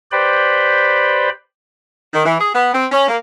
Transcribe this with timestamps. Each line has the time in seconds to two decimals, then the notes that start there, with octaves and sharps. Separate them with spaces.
0.12 G4 B4 C5 D5 G5 B5
2.13 D#3
2.26 E3
2.40 G#4
2.54 B3
2.74 C4
2.92 C#4
3.08 A#3